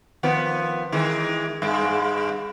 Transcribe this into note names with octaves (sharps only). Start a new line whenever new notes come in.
D#3 F3 B3
D#3 E3 G#3
G2 G#3